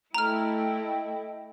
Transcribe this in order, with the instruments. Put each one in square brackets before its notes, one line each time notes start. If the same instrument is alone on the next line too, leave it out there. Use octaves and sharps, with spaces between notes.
[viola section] A3 E4 [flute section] A4 D#5 G5 [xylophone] A#5 F6